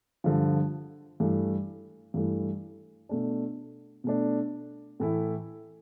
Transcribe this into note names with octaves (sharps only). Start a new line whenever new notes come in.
G2 D3 F3
G2 E3 A3
G2 E3 A3
B2 A3 D4
B2 A3 D4
A2 E3 A3 E4